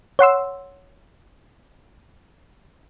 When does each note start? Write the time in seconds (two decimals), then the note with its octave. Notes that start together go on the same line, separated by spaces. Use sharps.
0.19 C#5 F#5 C6 E6